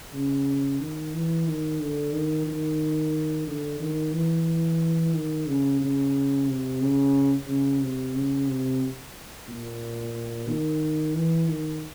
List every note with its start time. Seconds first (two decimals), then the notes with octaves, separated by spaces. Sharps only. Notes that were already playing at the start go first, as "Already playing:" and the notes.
0.13 C#3
0.80 D#3
1.14 E3
1.47 D#3
1.80 D3
2.13 D#3
2.47 D#3
3.47 D3
3.80 D#3
4.14 E3
5.14 D#3
5.47 C#3
5.81 C#3
6.47 C3
6.81 C#3
7.48 C#3
7.81 C3
8.15 C#3
8.47 C3
9.48 A#2
10.48 D#3
11.15 E3
11.48 D#3